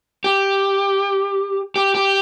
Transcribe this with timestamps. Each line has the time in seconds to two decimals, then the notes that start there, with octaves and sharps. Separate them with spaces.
0.24 G4
1.76 G4
1.95 G4